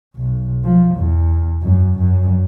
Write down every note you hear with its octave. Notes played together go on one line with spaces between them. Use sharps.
B1
F3
E2
F#2
F#2